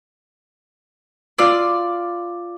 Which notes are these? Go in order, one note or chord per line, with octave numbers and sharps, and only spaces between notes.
F4 D5 C6 E6